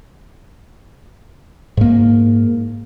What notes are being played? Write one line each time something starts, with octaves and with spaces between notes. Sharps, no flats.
G#2 A#3